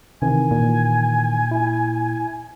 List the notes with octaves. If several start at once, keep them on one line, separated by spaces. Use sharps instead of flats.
C3 D#3 E3 G#5
A#2
E4